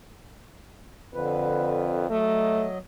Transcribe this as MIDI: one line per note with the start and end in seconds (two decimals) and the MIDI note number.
1.14 2.08 41
1.14 2.06 50
1.14 2.06 71
2.10 2.78 54
2.10 2.66 57
2.10 2.78 75